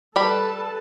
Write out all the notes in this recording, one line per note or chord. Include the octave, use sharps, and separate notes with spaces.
G3 A4 B4 A5 B5